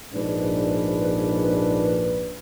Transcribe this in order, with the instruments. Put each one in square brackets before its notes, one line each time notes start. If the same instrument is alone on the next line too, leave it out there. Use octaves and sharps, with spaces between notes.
[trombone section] A#1 G#2 D4 B4